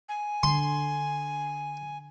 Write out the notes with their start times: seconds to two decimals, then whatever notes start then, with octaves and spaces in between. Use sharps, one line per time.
0.09 G#5
0.43 D3 C6